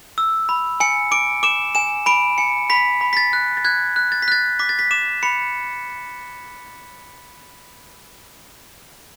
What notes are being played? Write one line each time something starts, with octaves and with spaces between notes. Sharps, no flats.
E6
B5
G#5 C#7
D6 D7
D6 E7
G#5 E7
B5 D7
G#5 C#7
B5 B6
B5
B6
A6
F#6
A6
F#6 G#6
F#6
A6
B6
F#6 A6
D6 B6
A6
B6
D6 E7
B5 C#7